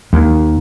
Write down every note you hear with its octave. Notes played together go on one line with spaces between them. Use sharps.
D#2